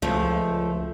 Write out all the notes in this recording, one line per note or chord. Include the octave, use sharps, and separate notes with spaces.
C#2 F3 A3